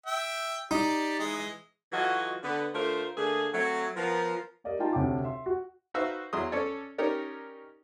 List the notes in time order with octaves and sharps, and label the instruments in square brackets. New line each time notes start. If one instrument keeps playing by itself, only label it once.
[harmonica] E5 G5
[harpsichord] D#4 [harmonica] G4 D5
[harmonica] E3 G#3 D#5
[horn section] E3 F#3 F4 F#4 A4 D#5
D3 B3
D3 A3 F4 A#4 C5
D3 A3 A#3 G#4
F#3 A3 C4
F3 B3 A#4
[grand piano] G4 A#4 D5 D#5 F5
D#4 F4 G5 A5 A#5
D2 C3 C#5 G5 A5 D6
E5 C6
F#4
[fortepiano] D#4 F#4 B4 C5 E5 F5
E2 F#3 E4 G#4 C6 D#6
C#4 A4 C#5 D5
C#4 D#4 G4 A#4 C#5 D5